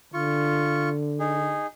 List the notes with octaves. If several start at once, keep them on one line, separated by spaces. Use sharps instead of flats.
D3 F4 C#6
D#4 G#4